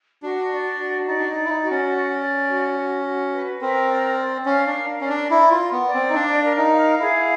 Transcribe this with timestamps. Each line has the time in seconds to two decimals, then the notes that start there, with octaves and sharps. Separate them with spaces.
0.23 D4 F#4
0.51 D5
0.80 F#4
1.07 D#4 D5
1.19 D4
1.29 D#4
1.36 D5
1.45 E4
1.50 D#4
1.64 F#4
1.71 C#4
1.92 D5
2.20 D5
2.48 F#4
2.77 F#4
3.04 F#4
3.33 B4
3.61 C4 A#4
3.89 D5
4.18 D5
4.45 C#4 F5
4.67 D4
4.74 A#4
5.01 C#4 D5
5.09 D4
5.30 E4 A#4
5.51 F4
5.58 A#4
5.72 B3
5.87 D5
5.94 C4
6.10 D#4
6.14 D4 F5
6.44 A#4
6.57 D#4
6.72 F5
7.00 E4 G#4